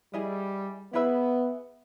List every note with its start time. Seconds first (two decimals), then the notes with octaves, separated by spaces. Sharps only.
0.13 G3 E4 G#4 D#5 G#5
0.93 B3 E4 G#4 B4 E5